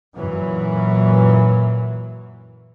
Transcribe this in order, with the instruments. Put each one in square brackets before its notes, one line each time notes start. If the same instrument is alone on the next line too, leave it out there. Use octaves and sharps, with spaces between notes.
[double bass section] F#2 A#2 E3 F#3